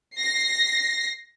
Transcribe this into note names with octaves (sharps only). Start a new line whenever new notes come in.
A#6 C7